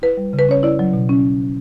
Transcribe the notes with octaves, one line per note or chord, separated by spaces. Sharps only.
E4 B4
G3
C#3
B4
C#4 C#5
E4 D5
F#3
B2
C#4